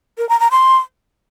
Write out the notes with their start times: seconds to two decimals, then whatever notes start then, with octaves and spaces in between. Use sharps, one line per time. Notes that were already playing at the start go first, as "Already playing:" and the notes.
0.18 A#4
0.29 A#5
0.40 A#5
0.51 C6